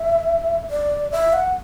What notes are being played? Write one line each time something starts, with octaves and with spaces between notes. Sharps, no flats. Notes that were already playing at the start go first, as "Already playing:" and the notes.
Already playing: E5
D5
E5
F#5